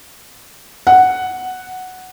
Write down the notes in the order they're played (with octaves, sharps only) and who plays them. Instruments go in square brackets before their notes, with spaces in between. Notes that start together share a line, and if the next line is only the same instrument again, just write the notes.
[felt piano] F#5